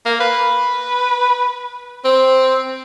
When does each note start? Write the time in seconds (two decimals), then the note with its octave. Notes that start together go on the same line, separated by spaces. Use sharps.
0.06 A#3
0.20 B4
2.04 C4